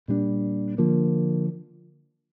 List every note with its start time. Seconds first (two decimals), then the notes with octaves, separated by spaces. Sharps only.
0.08 A#2 G3 D4
0.78 D3 F3 A#3